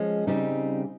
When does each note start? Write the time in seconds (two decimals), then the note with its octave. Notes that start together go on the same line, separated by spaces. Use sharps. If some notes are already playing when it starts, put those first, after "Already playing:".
Already playing: F3 G#3 C#4
0.27 C#3 G3 C4 D#4